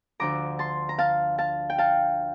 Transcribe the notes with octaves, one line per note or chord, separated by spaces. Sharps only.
D2 D3 F3 A#5 D6
A5 C6
A#5
F5 A5
F5 A5
G5
F5 A5